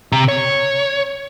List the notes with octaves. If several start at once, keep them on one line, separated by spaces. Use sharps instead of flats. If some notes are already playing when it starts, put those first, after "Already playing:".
C3 A#5
C#5